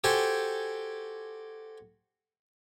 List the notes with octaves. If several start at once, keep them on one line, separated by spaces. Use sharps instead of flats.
F#4 G4 A4 C5 G5 G#5